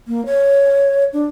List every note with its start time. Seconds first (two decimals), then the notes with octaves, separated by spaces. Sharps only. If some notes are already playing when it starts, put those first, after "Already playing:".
0.07 A#3
0.26 C#5
1.13 D4